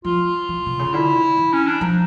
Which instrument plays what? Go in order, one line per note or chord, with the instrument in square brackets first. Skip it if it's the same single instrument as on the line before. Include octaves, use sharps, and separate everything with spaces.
[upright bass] F3 [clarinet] F4
[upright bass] E3
C3
C#3
[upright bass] D3 [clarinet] E4
[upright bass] E3
[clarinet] C#4
D4
[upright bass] F3 [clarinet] D#4